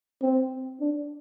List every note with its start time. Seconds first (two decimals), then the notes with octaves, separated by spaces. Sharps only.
0.22 C4
0.81 D4